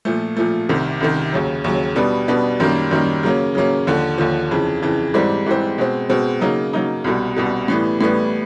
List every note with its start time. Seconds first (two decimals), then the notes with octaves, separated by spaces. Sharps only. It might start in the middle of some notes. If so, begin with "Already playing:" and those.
0.05 A#2 F3 A3
0.37 A#2 F3 A3
0.69 C2 C3 D#3
1.00 C2 C3 D#3
1.33 D#2 C#3 F#3
1.64 D#2 C#3 F#3
1.96 B2 G3 B3 D4
2.28 B2 G3 B3 D4
2.60 F#2 D#3 G3 A#3
2.91 F#2 D#3 G3 A#3
3.23 C#3 F#3 A#3 C#4
3.55 C#3 F#3 A#3 C#4
3.87 D#2 D3 F3
4.18 D#2 D3 F3
4.51 F2 C#3 E3
4.82 F2 C#3 E3
5.14 G#2 E3 G3 C4
5.46 G#2 E3 G3 C4
5.78 B2 G#3 C4
6.09 B2 G#3 C4
6.41 C#3 F#3 A#3 D#4
6.73 C#3 F#3 A#3 D#4
7.04 C2 B2 G3
7.37 C2 B2 G3
7.68 A2 E3 G3 B3
8.01 A2 E3 G3 B3